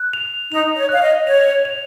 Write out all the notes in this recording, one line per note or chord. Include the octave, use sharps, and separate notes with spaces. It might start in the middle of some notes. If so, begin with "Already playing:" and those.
Already playing: F#6
F7
D#4 F7
C#5
F5 F#6
D#5
C#5 F7
F7